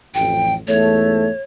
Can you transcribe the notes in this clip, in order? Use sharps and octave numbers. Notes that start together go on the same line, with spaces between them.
A1 F2 G5
E2 G#2 A3 C#5